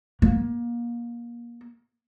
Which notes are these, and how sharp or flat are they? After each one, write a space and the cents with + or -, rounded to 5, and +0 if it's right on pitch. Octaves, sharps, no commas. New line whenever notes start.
A#3 +25